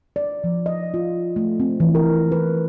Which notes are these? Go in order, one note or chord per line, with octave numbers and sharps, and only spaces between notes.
D5
F3
D#5
F4
A3
C4
E3
A#4
B4